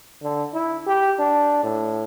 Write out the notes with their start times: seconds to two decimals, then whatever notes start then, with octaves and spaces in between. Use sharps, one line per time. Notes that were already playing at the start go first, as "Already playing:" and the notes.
0.23 D3
0.53 E4
0.87 G4
1.19 D4
1.63 A2